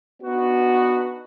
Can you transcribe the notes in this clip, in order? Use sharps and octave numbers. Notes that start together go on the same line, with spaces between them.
B3 D4 D#4 F#4